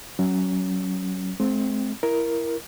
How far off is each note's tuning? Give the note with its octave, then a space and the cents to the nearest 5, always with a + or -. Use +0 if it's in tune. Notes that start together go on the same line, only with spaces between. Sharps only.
F#3 +15 C#4 +0
G#3 +40 C4 +0
E4 +15 A#4 +5